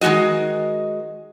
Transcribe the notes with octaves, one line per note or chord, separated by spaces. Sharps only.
D#3 G#3 C4 F#4 D#5